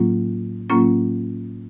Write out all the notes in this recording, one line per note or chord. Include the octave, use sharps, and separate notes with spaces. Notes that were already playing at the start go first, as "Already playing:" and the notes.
Already playing: A2 F#3 A#3 C#4 F4
A2 F#3 A#3 C#4 F4